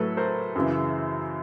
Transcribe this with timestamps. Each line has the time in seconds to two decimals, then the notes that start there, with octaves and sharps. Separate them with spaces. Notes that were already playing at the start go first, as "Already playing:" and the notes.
Already playing: A2 F#3 A3 A4 B4
0.17 A#4 C5
0.55 F#2 C#3 E3